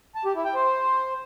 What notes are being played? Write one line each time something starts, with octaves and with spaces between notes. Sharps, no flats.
A5
G4
E4
G5
C5